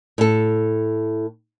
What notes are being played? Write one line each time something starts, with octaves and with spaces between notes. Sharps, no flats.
A2 A4